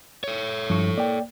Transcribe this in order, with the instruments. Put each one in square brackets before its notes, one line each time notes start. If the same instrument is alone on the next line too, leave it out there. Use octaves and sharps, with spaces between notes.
[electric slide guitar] A4 C#5
[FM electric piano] G2 C#6 [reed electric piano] F3
[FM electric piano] A#3 [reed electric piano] D5 G5